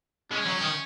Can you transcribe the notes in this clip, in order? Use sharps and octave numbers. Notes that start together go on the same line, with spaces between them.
G#3 C#4
F#3
D#3